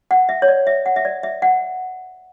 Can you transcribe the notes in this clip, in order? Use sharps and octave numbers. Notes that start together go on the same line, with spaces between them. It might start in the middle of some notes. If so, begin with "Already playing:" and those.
F#5
E5
C#5
D5
E5
F#5
E5
D5
E5
F#5